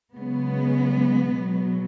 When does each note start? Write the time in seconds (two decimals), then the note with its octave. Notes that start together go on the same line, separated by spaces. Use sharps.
0.17 C#3 F#3 G#3 B3
1.34 B2 F#3